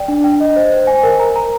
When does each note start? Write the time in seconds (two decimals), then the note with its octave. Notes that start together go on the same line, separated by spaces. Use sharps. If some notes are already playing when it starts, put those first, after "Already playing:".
Already playing: D5 G5
0.08 D4
0.24 G5
0.40 D#5
0.56 C5
0.72 C5
0.87 G#5
1.03 A#4
1.20 A#5
1.36 A#5